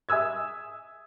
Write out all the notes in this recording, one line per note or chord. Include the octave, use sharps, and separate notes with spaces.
E5 G#5 D#6 E6 G#6